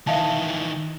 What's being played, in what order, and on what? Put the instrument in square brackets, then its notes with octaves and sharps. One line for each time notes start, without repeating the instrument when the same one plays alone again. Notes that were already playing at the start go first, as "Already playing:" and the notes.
[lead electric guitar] D#3 E3 [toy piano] E5 F5 A5